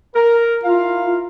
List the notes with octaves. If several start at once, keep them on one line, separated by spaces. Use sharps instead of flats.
A#4
E4 F4 A#4 F5